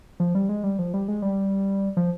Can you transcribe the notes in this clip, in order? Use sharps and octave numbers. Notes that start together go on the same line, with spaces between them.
F3
G3
G#3
G3
F3
G3
G#3
G3
F3